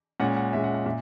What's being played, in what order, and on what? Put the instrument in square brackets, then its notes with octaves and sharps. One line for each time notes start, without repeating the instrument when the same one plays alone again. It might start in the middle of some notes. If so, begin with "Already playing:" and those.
[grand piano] A#2 G#3 C#4 F#5
F#5
A#2 G#3 C#4 E5
F#5
F#5
A#2 E5